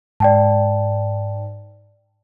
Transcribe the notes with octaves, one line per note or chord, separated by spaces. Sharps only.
G#2 D5 G5 A5